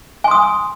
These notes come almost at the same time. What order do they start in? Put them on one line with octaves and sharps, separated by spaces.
G#5 C6 D#6